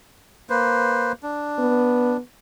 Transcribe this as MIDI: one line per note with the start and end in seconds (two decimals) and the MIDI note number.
0.50 1.12 58
0.50 1.12 71
0.50 1.12 72
1.23 2.17 62
1.59 2.19 59